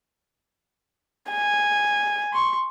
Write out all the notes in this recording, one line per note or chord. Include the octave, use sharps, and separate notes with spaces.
G#5
C6 C#6